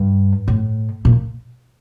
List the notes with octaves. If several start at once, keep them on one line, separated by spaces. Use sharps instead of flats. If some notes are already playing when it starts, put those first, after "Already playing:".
Already playing: G2
A2
A#2